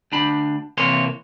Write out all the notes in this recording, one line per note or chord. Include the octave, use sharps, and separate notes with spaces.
D2 D4 B5
C3 E3 A#3 C#5 C6